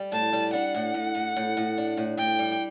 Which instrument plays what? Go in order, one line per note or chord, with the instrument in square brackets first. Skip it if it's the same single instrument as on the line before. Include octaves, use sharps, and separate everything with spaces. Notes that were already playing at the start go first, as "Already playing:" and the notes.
Already playing: [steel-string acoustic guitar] G3
[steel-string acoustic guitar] A2 [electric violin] A5
[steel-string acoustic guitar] G3
[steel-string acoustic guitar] D4 [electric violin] F#5
[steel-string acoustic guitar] A2
A2
A2
A2
A2
D4
A2
[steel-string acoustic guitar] A2 [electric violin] G5
[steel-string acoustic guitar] G3